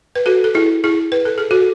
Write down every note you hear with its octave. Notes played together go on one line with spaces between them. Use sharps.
B4
F#4 A4
A4
E4 G#4
E4 G#4
B4
A4
G#4
F#4 A4